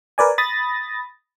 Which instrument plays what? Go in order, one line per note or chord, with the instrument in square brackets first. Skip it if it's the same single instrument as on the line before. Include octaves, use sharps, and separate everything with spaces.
[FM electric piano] A#4 B4 D5 G#5
B5 D#6 A6 A#6